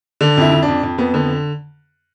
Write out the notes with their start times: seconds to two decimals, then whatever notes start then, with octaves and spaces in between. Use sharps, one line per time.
0.21 D3 D4
0.37 F2 E4
0.52 F2
0.63 D4
0.68 F2
0.83 F2
0.98 F2 B3
1.14 D3 B3